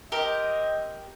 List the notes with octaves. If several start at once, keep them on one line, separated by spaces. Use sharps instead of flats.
C4 G4 A#4 D#5